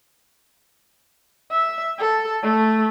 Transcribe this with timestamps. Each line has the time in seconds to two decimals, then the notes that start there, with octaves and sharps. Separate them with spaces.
1.51 E5
1.99 A4
2.42 A3